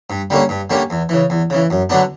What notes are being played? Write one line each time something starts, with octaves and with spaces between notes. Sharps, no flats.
G2
D3 G3 A#3 C#4
G2
D3 G3 A#3 C#4
E2
C#3 E3
E2
C#3 E3
F#2
D3 F#3 B3 D4